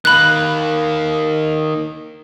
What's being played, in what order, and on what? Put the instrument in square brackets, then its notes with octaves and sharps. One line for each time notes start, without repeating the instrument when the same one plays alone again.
[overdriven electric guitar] D#3 A#3 [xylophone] B5 F#6